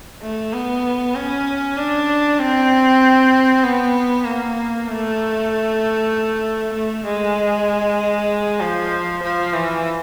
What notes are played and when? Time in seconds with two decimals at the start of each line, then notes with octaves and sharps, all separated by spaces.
0.22 A3
0.53 B3
1.15 C#4
1.78 D4
2.39 C4
3.64 B3
4.25 A#3
4.88 A3
6.74 A3
7.05 G#3
8.61 F3
9.23 F3
9.54 E3